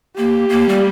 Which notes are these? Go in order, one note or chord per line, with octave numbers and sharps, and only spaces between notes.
A#3 G4
A#3
G3